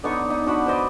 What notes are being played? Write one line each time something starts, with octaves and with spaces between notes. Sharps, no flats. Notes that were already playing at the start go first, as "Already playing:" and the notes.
D3 B3 D#4 C#6
D#4
D4 F#4 F#5 B5
B4 C5 D5 D#5